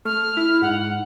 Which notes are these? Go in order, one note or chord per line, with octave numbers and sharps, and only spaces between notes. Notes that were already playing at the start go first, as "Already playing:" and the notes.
A3 F6
E4
G#2 F#5